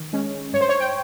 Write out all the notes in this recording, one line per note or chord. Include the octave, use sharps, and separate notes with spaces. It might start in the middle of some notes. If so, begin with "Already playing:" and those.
Already playing: D#3
G#3 C#4
G2 C#5
C5
C#5
G5